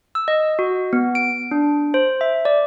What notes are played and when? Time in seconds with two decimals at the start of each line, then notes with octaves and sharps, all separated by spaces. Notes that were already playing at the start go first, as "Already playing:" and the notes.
0.15 E6
0.28 D#5
0.59 F#4
0.93 B3
1.15 D7
1.51 D4
1.94 C5
2.21 E5
2.45 D5